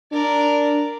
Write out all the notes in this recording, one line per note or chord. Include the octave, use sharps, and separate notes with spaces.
D4 A#4 D5